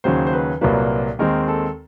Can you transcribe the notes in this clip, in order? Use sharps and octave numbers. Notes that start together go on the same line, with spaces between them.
D#2 C#3 F#3 C5
C5
B4
C2 A#2 F#3 A#3 B4
D#2 D#3 G#3 C4 A#4
A4